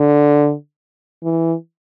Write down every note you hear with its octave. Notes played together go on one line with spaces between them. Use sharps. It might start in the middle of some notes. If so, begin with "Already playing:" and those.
Already playing: D3
E3